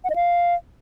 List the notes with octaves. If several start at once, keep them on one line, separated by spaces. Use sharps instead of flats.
F#5
D#5
F5